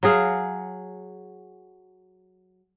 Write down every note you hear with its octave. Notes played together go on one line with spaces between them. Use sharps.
F#3 F#4 G#4 F5